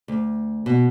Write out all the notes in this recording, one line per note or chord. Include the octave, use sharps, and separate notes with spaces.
D2
B2